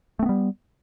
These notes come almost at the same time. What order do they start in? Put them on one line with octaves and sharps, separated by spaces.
A3 C4 B3 G3